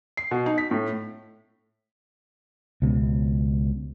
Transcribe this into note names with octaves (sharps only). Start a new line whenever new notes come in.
C7
B2
D#4
B6
A2
C#2 B2